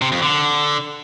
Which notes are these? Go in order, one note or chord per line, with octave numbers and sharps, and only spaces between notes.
C3
F2
D3